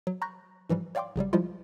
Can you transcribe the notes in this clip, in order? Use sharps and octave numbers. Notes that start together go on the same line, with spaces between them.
F#3
A#5 B5 C#6 F#6 G6 A#6
G#2 E3 F3 G3
C#5 D5 F5 G5 C6 D6
A1 C#3 F#3 G3
F3 G3 G#3 E4 F4